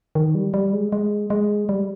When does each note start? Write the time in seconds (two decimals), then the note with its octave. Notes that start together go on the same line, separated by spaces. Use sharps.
0.15 D#3
0.35 G3
0.54 G3
0.73 G#3
0.92 G#3
1.30 G#3
1.69 G3